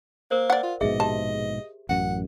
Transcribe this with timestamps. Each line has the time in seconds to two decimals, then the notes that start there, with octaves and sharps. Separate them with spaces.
0.31 A#3 A#4 C5
0.50 D5 F#5
0.63 F4
0.81 A#1 G#2 B2 G#4 D#5 E5
1.00 G4 A5
1.89 A1 F#2 F#5